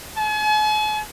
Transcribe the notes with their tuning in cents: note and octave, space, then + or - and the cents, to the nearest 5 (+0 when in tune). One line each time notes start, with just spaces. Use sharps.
G#5 +45